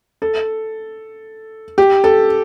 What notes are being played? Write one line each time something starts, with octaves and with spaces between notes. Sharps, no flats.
A4
G4
A4